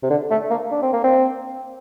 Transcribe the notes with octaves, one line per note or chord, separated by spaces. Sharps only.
C3
D3
A3
A#3
D4
C4
A#3
C4